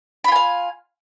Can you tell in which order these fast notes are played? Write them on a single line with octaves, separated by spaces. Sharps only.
B5 F4 G#5 F5